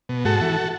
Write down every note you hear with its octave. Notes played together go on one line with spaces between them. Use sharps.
B2
G#2 F#4 A4
E3